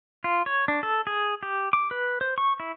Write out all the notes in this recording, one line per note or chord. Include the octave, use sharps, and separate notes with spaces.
F4
C#5
D4
A4
G#4
G4
D6
B4
C5
C#6
E4